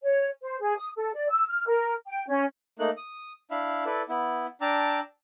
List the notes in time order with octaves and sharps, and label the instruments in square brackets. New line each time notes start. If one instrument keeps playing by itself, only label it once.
[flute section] C#5
C5
G#4
D#6
A4
D5
E6
F6
A#4
G5
C#4
[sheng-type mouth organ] A3 A#3 D#4 F#6
D#6
D4 E4 E5 F5 B5
E4 A4 B4 D5
B3 E4
D4 G5 A5 A#5 D6 E6